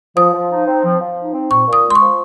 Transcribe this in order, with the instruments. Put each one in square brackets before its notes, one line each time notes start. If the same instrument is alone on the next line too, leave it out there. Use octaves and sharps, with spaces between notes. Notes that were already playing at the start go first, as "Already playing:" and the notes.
[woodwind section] F3 [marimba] D#6
[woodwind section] F3
D#4
C4
F3
F3
D#4
C4
[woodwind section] A#2 [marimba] C#6
[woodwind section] A#2 [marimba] D#6
[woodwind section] G#3
[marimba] C6
C#6
[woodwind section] F3